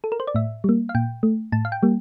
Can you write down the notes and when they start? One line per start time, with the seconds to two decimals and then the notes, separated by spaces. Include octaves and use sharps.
0.04 A4
0.12 A#4
0.20 C5
0.27 D5
0.35 A2 E5
0.64 G3 A#3
0.89 F5
0.95 A#2 G5
1.23 A3
1.52 A2 A5
1.65 F5
1.72 G5
1.83 G3 A#3